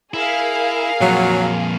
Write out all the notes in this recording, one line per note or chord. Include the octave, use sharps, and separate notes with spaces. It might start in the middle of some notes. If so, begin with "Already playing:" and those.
E4 G#4 A#4 F5
F2 A#2 F#3